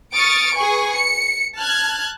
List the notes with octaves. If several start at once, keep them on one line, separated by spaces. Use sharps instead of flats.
C#6 D#6 F6 A6 C#7 D7
G#4 B4 G#5 C#6
C#7
A5 F6 F#6 G#6